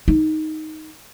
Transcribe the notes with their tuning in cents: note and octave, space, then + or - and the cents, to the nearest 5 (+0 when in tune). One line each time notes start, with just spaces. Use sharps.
D#4 +5